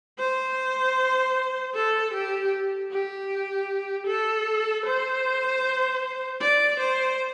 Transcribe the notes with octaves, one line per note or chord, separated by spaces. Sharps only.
C5
A4
G4
G4
A4
C5
D5
C5